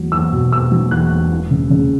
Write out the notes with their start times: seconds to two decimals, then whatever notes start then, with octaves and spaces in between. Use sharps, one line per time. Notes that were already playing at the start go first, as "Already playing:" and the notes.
Already playing: E2 F#3
0.12 E2 E6
0.32 B2
0.52 B2 E6
0.71 F#3
0.91 E2 F#6
1.11 E1
1.30 E3
1.51 C#3
1.70 C#3